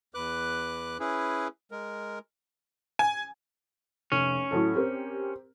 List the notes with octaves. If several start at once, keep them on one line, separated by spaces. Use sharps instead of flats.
E2 B4 D6 F#6
C#4 E4 G#4 B4
G#3 A#4
G#5
F1 C#4
A2 F#3 A4
C4 G4 A#4